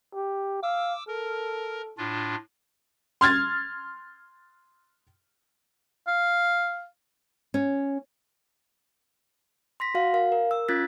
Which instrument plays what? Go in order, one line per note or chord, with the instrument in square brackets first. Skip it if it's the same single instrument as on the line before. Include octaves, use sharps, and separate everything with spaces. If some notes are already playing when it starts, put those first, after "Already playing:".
[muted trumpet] G4
[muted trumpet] F5 [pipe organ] D6 E6
[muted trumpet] A4 [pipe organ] A#4
[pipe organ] A2 D4 F4
[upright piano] C6 F6 G#6 A6
[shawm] F5
[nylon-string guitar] C#4
[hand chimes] C6 A#6 B6
F#4 F5 F#5
A#4 F5
A#4
E6
C#4 F4 F#6 G#6 A6 B6